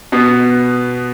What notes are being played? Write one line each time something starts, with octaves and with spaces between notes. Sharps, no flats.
B2 B3